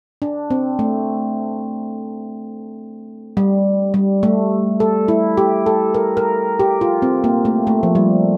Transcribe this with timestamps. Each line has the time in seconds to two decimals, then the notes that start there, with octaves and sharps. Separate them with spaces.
0.22 D4
0.51 C4
0.79 A3
3.37 G3
3.94 G3
4.23 A3
4.80 A4
5.08 E4
5.37 G4
5.66 A4
5.95 A#4
6.17 A#4
6.60 G4
6.81 F4
7.02 C4
7.24 A#3
7.45 A3
7.67 A3
7.83 F3
7.95 G3